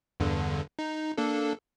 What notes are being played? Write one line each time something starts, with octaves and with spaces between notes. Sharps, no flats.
E2 G2 D3
D#4
A#3 D4 A4